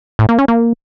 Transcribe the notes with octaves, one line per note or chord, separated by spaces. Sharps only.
A2
A#3
C#4
A#3